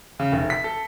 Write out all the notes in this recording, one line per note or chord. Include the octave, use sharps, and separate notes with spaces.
C#3
F1
B6
A4